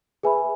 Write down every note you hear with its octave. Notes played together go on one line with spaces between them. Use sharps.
G#4 B4 E5 G#5 B5